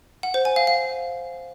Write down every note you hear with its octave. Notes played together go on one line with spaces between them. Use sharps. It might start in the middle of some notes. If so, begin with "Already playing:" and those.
F#5
C5
G#5
F5
F5